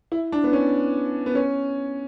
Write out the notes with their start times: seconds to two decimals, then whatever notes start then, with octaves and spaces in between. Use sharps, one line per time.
0.12 E4
0.32 D4
0.44 B3
0.53 C#4
1.26 B3
1.35 C#4